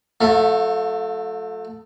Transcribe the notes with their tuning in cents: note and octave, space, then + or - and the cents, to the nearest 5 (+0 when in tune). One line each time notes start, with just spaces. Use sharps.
F#3 -45 A3 +0 F5 +25